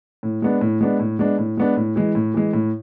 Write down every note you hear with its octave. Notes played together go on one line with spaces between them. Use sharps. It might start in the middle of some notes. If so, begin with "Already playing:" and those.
A2
G#3 B3 D4
A2
G#3 B3 D4
A2
G#3 B3 D4
A2
G#3 B3 D4
A2
E3 G#3
A2
E3 G#3
A2